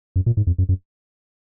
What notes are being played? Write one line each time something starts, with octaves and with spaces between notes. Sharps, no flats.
F#2
A#2
G#2
F2
F#2
F#2